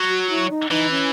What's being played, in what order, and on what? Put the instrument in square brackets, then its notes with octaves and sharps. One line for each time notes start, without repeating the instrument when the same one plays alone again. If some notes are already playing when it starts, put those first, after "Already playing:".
Already playing: [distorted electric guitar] F#3
[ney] F#4
E4
D#4
[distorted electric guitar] E3 [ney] D#4
[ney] C#4